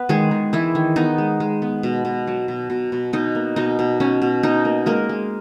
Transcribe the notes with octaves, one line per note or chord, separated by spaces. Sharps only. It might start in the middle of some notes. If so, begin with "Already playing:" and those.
Already playing: B3 B4
D#3 G#3 G#4
D#3
E3 G#3 E4
D#3
B3 D#4
G#3
G#3
B3
B2
B2
F#3
B2
B2
B2
B2 D#4
A#3
B2 D#4
B2
B2 C#4
B2
B2 D#4
A#3
G#3 A#3 A#4
G#3